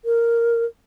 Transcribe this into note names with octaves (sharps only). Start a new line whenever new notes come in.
A#4